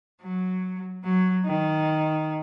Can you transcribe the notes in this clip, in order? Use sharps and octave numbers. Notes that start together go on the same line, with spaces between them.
F#3
F#3
D#3